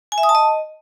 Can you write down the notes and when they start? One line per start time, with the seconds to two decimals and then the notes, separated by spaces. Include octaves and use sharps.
0.12 G#5
0.18 E5
0.23 D#6
0.29 A5
0.35 D#5